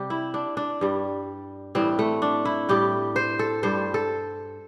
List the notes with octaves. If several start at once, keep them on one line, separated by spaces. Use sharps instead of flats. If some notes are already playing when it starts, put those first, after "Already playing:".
Already playing: C3 G3 G4
E4
D4
D4
G2 G3
A2 E3 G3 C4
A3
D4
E4
A2 G3 G4
C5
A4
G2 G3 C5
A4